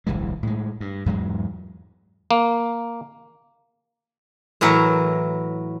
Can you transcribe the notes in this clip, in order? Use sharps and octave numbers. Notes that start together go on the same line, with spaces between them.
D1 B1 E3 G#3
A2 G#3
G2
E2 G#2 F#3 G#3
A#3
A2 E3 F#3 E4 A#4